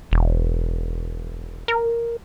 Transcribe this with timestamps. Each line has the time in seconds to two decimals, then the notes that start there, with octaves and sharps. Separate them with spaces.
0.11 E1
1.68 A#4